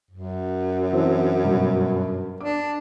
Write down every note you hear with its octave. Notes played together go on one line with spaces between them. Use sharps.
F#2
E3 C4 D4
G2 B2 F#3
D4 D6